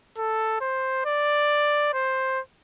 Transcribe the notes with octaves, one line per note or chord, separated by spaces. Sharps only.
A4
C5
D5
C5